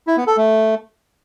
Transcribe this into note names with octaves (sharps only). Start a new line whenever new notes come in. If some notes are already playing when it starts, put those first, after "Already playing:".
E4
B3
A4
A3